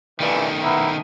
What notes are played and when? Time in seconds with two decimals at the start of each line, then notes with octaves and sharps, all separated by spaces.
0.20 G2 A#2 D#3 E3 A3
0.63 B3 E4 A#4